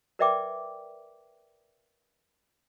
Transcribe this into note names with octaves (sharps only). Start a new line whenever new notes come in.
A#4 B4 D5 E5 G5 D6